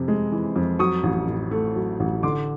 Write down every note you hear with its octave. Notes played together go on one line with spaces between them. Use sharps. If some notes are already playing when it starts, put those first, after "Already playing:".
Already playing: F2 C3
G#3
E3
F2
F#3 C#6 D#6
A1
A2
A3
F#3
A1
D3 C6 D6